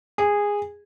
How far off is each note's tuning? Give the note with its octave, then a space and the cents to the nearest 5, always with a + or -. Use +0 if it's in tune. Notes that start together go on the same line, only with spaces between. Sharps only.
G#4 -15